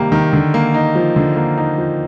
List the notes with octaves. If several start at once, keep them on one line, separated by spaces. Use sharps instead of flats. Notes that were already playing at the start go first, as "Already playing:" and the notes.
Already playing: C3 D#3 G3 A#3
D#3
D3
A#3
D#4
F3
D3
A#3
D#4
F3